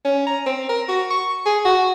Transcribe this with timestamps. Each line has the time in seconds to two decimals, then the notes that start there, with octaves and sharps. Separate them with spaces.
0.05 C#4
0.27 A#5
0.46 C4
0.69 A#4
0.88 F#4
1.10 C#6
1.46 G#4
1.65 F#4